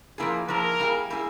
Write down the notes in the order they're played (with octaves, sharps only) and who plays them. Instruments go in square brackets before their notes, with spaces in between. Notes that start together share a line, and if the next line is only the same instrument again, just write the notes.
[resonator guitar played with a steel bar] F3 A#3 E4 G#4
[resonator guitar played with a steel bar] F3 A#3 E4 G#4 [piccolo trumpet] A#4
[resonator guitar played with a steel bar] G3 A#3 E4 G#4
G3 A#3 E4 G#4